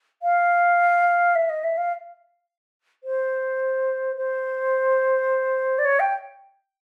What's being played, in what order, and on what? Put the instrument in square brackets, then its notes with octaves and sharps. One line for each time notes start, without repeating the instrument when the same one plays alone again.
[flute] F5
E5
D#5
E5
F5
C5
C5
D5
C#5
G5